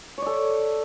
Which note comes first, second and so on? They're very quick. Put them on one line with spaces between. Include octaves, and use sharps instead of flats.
C#5 D5 A4